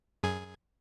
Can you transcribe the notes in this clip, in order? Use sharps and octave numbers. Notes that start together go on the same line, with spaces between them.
F#2 G#4 G#6